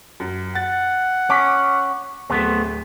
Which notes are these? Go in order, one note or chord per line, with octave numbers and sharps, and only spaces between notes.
F#2
F#5 A6
C#4 D6 B6
D1 A3 B3 C4